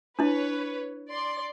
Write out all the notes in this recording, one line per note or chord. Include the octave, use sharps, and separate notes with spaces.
D4 E4 B4 C#5
D5 C6